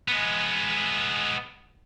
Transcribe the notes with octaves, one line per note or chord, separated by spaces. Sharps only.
G#3 B3